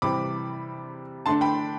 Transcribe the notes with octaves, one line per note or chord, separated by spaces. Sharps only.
C3 E3 G3 C4 B5 D6
D3 A3 D4 A5 C6
G5 B5